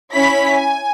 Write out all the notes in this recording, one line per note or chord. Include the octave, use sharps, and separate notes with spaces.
C#4 E4 C#5 B5 B6
G#5